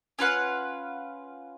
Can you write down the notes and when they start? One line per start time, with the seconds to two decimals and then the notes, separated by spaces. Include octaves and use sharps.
0.19 C#4 F4 B4 F#5